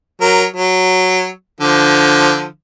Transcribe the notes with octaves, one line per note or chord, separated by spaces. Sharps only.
F#3 A#4
F#3
D3 F3